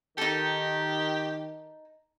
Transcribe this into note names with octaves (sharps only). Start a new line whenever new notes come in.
D#3 D#4 G4 A4